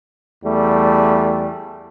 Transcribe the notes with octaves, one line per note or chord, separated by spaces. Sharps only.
E2 G3 A3